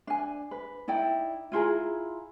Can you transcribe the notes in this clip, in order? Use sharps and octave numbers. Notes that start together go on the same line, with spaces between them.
D4 G#5
B4
D#4 E4 D5 G5
E4 F4 G#4 A#5